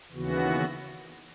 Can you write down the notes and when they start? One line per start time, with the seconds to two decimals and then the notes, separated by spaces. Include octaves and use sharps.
0.12 D#2 C#3 E3 B3 F#4